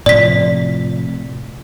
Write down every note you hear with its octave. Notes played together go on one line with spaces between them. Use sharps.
A2 C3 F3 D5 B6